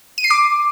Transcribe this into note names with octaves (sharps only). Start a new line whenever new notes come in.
D#7
C7
D6